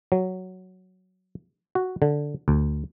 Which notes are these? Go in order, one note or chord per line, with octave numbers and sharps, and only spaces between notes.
F#3
F#4
D3
D2